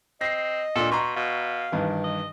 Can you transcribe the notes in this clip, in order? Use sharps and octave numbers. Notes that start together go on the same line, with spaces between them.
C4 D#5 A#6 C7
A#2 D4 A4
B2 A#5 C6 C#6
B2 F5
G2 D#3 E3
D#5